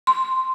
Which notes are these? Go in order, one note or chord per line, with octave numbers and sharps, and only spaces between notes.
C6